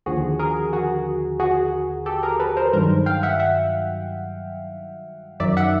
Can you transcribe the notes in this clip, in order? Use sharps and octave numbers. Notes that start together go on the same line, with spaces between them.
D#2 D3 F3 F#4 G#4
G#4 A#4
F#4 G#4
F#4 G#4
G4 A4
G#4 A#4
A4 B4
A#4 C5
G2 D#3 F#3 A#4 C5
F5 G5
E5 F#5
E5 F#5
F#2 D#3 F#3 D5 E5
E5 F#5